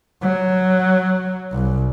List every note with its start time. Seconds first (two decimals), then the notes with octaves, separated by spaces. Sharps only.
0.22 F#3
1.52 C2